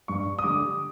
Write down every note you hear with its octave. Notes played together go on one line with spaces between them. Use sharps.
G2 C#6
D#6
D3 G3 D6